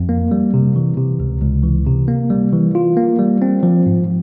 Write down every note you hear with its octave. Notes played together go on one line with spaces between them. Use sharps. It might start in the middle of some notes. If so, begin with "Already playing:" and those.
Already playing: F2
A#3
G3
C3
E3
C3
C#2
C#2
E3
C3
A#3
G3
E3
F4
A#3
G3
C4
F3
G#2